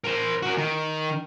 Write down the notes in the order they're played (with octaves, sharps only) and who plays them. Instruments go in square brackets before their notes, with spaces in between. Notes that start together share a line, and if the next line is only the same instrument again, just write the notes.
[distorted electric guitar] A#4 C5
F#4 A#4
D#3